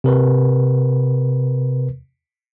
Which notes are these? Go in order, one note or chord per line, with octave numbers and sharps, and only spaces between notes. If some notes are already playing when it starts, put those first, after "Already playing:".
C3 A#4 B4